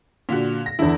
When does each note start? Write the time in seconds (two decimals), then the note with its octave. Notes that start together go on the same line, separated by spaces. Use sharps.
0.29 A#2 D3 F#4 B6
0.66 A#6
0.79 E2 D3 E4